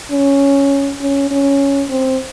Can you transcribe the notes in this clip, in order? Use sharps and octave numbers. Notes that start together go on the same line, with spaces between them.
C#4
C#4
C#4
C4